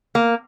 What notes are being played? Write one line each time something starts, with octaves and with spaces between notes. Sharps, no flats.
A#3